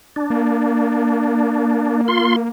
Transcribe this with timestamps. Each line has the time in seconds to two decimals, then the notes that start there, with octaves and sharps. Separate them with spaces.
0.16 D4
0.30 A#3
2.08 F4 C6